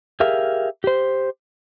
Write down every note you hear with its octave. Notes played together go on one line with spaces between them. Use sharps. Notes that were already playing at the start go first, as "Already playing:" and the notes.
G4 G#4 A#4 E5 F5
G4 C5